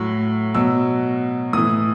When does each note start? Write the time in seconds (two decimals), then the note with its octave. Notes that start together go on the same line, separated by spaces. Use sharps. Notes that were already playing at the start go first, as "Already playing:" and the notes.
Already playing: A2 F#3
0.55 B2 F#3 E6
1.53 A2 E3 D#6